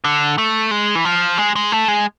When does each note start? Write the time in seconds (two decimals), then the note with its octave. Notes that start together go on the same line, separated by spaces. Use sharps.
0.04 D3
0.38 A3
0.71 G#3
0.95 E3
1.05 F3
1.38 G#3
1.56 G#3
1.72 A3
1.88 G#3